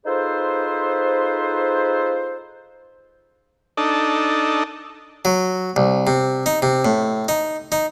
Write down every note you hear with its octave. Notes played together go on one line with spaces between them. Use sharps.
D#4 F4 G#4 A4 B4 C5
D4 D#4 A4
F#3
C2
C3
D#4
C3
A2
D#4
D#4